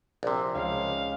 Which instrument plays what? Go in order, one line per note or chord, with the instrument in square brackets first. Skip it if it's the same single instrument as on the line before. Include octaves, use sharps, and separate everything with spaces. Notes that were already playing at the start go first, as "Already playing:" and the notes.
[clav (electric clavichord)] A#1 C3
[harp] C#2 F4 [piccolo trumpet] F5